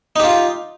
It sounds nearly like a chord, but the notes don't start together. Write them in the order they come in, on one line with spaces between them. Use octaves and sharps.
D#4 G4 F4